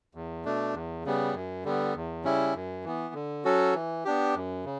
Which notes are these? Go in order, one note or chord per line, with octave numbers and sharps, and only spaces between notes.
E2
B2 A3 D4
E2
C#3 G3 B3
F#2
D3 G3 B3
E2
C#3 G3 C#4 E4
F#2
E3 B3
D3
F#3 C#4 F#4 A4
E3
B3 D4 G4
F#2
C#3